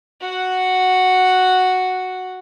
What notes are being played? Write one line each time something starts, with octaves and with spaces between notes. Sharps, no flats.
F#4 F#5